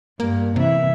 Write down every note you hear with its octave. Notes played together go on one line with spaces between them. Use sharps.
G2 A#3
C3 E3 E5